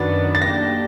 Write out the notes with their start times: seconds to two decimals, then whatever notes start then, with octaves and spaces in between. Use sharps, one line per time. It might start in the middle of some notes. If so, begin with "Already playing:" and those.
Already playing: F#2 D#3 F#3 B3 D4 A6
0.35 A6
0.42 A#3 D4 G4 A#6